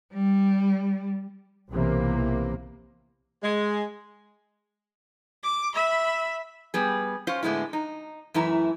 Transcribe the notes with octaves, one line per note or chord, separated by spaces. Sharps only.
G3
B1 C3 E3 A#3
G#3
D6
E5 B5
G3 B3 G#4
C#4 F4 C5
A2 D3 G#3 B3 E4
D#4
F#2 E3 A3 E4 A#5